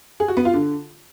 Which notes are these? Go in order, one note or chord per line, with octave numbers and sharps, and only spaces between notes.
G#4
F#4
B3
F4
D3